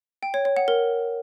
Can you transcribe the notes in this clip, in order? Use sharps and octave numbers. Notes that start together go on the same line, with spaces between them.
G5
C#5
C#5
F#5
A#4